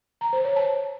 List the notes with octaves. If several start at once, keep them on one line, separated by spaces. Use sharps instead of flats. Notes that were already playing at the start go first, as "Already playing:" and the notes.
A#5
C5
C#5
A5